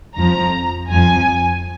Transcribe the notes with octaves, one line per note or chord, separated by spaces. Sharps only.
F2 F3 A#5
F2 F3 G#5